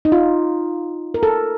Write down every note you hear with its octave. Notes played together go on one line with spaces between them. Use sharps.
D#4
F4
A#4
A4